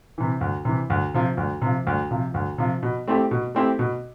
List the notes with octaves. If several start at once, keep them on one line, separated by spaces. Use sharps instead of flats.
C3 E3
D2
C3 E3
D2
C3 F3
D2
C3 F3
D2
C3 F3
D2
C3 F3
B2
A3 C4 E4 G4
B2
A3 C4 E4 G4
B2